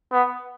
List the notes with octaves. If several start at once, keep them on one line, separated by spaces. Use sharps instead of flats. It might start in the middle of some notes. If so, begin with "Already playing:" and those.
B3